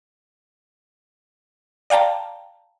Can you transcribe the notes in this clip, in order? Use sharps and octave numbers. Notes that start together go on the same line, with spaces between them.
D5 F5 G5 A5 A#5